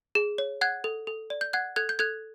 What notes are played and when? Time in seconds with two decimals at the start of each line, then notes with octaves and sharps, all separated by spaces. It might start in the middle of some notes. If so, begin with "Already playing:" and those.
0.15 G#4
0.38 C#5
0.61 F#5 F#6 G#6
0.84 A4
1.07 A4
1.30 D5
1.41 G6
1.53 F#5 F#6 G#6
1.76 A4 F#6 G#6
1.89 G6
1.99 A4 F#6 G#6